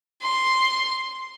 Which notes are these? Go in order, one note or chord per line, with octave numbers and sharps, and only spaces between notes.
C6